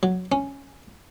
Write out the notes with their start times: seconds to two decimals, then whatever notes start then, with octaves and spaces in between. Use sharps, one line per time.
0.03 F#3
0.32 C#4